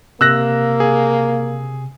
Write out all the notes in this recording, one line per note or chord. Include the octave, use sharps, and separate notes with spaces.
C3 A#3 E6 F#6 A#6
G#4